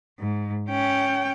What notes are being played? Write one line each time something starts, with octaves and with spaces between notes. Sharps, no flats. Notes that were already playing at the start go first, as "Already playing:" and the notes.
G#2
C#4 G5